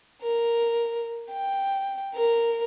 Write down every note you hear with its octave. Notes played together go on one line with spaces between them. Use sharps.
A#4
G5
A#4